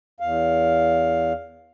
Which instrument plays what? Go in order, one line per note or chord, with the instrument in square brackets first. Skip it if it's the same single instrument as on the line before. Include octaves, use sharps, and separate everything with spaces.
[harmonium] E2 F5